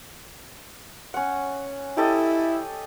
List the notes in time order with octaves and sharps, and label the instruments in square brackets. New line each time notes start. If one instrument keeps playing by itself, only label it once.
[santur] C#4 F#5
[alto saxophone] E4 [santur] G4 A4 D#5